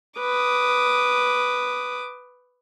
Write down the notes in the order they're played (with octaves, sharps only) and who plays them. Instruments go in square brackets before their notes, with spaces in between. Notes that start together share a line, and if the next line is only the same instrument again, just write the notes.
[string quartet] B4 D6 D#6